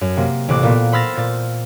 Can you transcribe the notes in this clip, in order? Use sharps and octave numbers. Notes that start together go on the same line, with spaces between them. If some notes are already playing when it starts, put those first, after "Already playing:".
F#2
C3 A#3
A1 C3 D6 F#6
A#2 A#3 B3
C5 B5 E6 F6 A6 A#6
A#2 A6